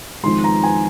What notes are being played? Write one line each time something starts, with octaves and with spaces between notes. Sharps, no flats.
F2 D#3 G#3 C6
A#5
G#5